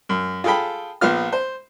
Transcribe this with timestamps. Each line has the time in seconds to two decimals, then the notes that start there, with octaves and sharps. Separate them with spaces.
0.09 F#2
0.44 F4 G#4 A4 G5 B5
1.01 A#1 B3 F4 F6
1.32 C5